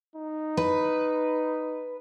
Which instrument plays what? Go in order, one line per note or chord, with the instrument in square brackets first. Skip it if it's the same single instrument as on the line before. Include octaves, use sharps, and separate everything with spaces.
[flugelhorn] D#4
[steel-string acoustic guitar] B4